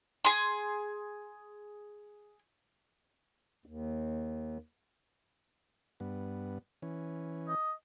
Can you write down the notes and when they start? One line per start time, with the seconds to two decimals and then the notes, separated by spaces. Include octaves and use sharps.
0.25 G#4 C6
3.66 D#2
6.00 G2 B3
6.82 E3 C#4
7.48 D#5